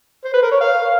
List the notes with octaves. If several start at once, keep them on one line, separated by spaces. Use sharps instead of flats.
C5
B4
A#4
C#5
F5